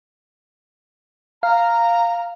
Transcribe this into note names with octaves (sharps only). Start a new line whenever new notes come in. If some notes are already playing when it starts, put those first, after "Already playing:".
F5 A#5